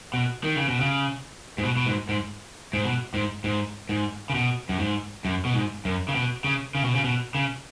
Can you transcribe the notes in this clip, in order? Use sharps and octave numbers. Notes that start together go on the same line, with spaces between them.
B2
D#3
C#3
B2
C#3
G#2
B2
B2
G#2
G#2
G#2
B2
G#2
G#2
G#2
C#3
B2
F#2
G#2
F#2
B2
G#2
F#2
C#3
B2
C#3
C#3
B2
C#3
B2
C#3